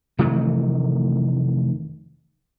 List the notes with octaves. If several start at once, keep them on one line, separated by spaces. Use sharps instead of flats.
F1 D#3 E3 A3